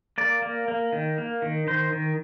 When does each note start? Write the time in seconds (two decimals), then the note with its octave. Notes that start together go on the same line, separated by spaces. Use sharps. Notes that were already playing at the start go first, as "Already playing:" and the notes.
0.18 A#3 D5
0.42 A#3
0.68 A#3
0.93 D#3
1.18 A#3
1.42 D#3
1.67 D#3 C5
1.92 D#3